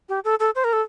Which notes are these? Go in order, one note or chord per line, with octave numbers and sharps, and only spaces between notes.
G4
A4
A4
C5
A#4
A4